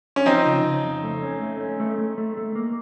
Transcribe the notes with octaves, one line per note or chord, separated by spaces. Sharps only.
C#4
F3 C4 D#4
C#3
C#3
F2
A3
C#4
A3
C#4
A3
A3
A3
A3
A#3